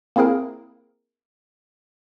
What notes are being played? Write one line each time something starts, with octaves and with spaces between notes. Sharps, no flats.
A#3 C4 E4 G#4 A#4